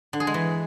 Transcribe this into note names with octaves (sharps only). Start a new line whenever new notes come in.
D3
G#4
G#3
E3